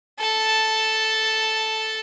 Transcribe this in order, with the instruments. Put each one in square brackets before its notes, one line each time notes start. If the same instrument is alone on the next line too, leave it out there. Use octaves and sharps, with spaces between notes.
[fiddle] A4 A5